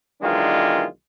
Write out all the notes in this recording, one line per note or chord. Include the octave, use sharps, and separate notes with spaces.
B1 D#3 E3 G#3 D4 F4